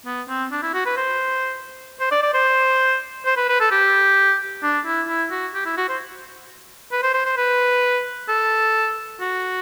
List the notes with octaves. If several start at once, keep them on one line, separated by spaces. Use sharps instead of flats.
B3
C4
D4
E4
F#4
B4
C5
C5
D5
D5
C5
C5
B4
B4
A4
G4
D4
E4
E4
F#4
G4
E4
F#4
C5
B4
C5
C5
C5
B4
A4
F#4